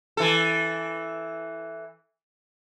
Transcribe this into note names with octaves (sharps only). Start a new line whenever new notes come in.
E3 A4